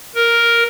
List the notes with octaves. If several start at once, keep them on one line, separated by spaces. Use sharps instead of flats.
A#4